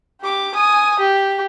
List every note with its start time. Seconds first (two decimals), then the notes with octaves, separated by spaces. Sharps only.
0.22 G4 D6
0.54 G#5 D#6
1.00 G4